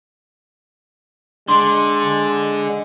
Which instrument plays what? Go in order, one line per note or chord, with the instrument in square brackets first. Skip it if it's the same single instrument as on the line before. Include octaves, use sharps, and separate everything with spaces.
[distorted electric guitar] D3 [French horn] G#3 [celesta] C6